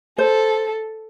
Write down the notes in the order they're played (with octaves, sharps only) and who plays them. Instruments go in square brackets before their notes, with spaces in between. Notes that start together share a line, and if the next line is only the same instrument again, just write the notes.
[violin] A4 [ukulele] C5